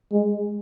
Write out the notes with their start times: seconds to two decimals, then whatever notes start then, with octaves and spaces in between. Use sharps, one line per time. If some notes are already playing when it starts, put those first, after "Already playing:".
0.12 G#3